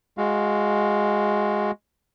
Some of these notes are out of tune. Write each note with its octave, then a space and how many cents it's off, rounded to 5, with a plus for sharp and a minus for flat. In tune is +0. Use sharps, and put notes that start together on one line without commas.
G#3 +0 F#4 -15 F5 +0